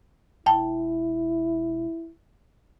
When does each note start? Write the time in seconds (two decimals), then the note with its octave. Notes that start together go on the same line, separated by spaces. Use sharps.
0.46 E1 E4 G5 A5